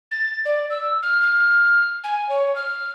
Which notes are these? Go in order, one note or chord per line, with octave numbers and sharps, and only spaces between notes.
A6
D5
E6
F6
F6
G#5
C#5
F6